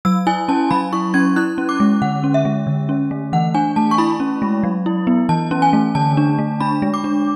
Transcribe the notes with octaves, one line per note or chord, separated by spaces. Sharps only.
F#3 E6
E4 G#5
C#4 A5
F#3 B5
E4 C#6
C#4 G#6
E4 F#6
C#4
D6
G#3
D3 F#5
C#4
E5
G#3
D3
C#4
A3
E3 F#5
D4 G#5
A3 A5
C#6
E4 B5
C#4
G#3
F#3
E4
B3
E3 A5
C#4
G#5
A3
D3 A5
D4
A3
D4 B5
G#3
D6
D4